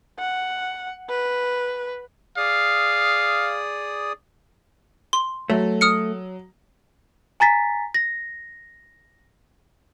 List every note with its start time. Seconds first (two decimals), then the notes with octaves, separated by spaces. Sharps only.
0.19 F#5
1.09 B4
2.37 G#4 D5 F5 D#6
5.13 C6
5.50 F#3 A3
5.81 D#6 F6 C#7
7.40 G#5 A#5 A6 B6
7.94 A#6